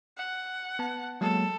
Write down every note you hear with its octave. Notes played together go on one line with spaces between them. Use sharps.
F#5
B3 A5
F#3 G#3 A#3 A4